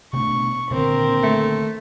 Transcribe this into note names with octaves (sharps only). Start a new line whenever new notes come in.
B2 A3 D4 C#6
A#2 D3 D#3 C4 A#4
A3